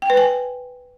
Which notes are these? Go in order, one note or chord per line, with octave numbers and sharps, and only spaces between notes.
G5
B4
G#5